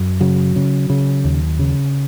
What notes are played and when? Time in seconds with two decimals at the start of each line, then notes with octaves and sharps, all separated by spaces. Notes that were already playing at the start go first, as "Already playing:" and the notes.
Already playing: F#2
0.21 C#3 F#3
0.56 C#3
0.90 C#3
1.24 D#2
1.59 C#3